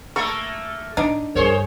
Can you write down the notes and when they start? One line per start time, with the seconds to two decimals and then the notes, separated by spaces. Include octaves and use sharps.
0.16 A3 A#3 A4 C#6
0.97 A2 D4 D#4
1.35 D2 G2 G#4 A#4 C5 C#5